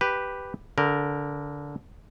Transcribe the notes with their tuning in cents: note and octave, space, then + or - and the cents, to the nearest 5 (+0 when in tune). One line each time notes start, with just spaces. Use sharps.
G4 +0 B4 +0
D3 -20 A#4 +0